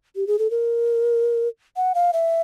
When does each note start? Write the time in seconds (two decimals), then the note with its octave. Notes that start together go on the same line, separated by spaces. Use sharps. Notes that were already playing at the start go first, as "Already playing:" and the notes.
0.16 G4
0.27 G#4
0.39 A4
0.51 A#4
1.76 F#5
1.95 F5
2.13 E5